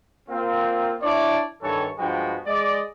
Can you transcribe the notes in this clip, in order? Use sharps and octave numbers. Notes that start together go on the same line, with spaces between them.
A#3 C4 F4
D4 E4 C#5 D5
G2 D#3 E3 A4 C#5
G2 F3 G#3 B3 F#4 G5
G#3 D5 D#5